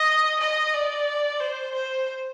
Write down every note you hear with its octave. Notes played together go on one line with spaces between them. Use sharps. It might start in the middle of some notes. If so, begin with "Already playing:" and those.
Already playing: D#5
D#5
D5
C5
C5